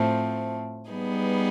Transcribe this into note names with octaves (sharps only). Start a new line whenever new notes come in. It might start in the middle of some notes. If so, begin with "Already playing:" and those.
Already playing: A2 F3 A3 C4
G3 B3 D#4 G#4 B4